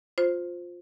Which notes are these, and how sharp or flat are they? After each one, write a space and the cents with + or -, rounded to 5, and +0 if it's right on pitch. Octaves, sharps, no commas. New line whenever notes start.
F4 +15 C5 +0